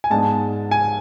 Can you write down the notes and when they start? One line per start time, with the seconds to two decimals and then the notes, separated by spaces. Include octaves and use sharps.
0.04 G#5
0.10 G#2 G#3 B3 D4 A5
0.71 G#5